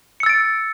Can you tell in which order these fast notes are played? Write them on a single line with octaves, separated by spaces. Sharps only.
C#7 E6 A6 D7